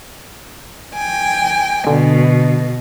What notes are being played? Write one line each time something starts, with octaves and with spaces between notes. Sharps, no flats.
G5 G#5
B2 D3